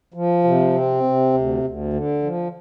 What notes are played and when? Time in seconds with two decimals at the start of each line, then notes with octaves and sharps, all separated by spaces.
0.14 F3
0.44 C3
0.73 C4
1.03 C3
1.33 D2
1.63 D2
1.93 D3
2.22 F3